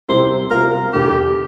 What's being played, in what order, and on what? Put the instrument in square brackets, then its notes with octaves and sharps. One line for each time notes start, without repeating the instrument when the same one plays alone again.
[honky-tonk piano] C3 G3 C4 E4 A#4 [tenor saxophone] C5
[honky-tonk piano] C3 G3 C4 F4 [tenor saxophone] A#4
[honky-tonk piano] E2 D3 A3 D4 [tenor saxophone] G4